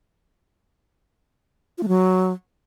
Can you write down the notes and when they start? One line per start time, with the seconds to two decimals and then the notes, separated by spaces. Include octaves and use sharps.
1.78 F4
1.83 A3
1.88 F#3